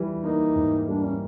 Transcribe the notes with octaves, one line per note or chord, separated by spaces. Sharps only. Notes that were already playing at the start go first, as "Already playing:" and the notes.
Already playing: E3 G3
A#3 D#4
G#2
G3 D4
C#4